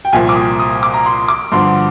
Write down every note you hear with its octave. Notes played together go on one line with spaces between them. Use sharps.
G5
C2 A#2 F3 G#5
D6
D#6
D#6
D6
A#5
C6
D6
G2 D3 F3 C6